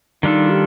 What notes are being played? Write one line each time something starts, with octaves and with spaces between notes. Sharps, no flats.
D#3 G3 D4 D#4 F4 A4
G4